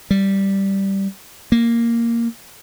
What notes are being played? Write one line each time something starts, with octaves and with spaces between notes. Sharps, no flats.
G3
A#3